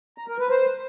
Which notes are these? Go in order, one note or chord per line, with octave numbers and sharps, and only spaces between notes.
A#5
A#4
B4
C5